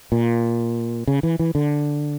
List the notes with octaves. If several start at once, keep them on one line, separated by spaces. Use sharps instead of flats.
A#2
C#3
E3
E3
D3